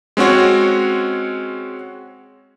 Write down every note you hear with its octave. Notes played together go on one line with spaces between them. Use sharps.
G#3 C4 C#4 F#4 C#5